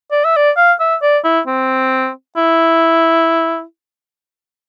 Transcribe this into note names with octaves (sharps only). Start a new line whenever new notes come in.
D5
E5
D5
F5
E5
D5
E4
C4
E4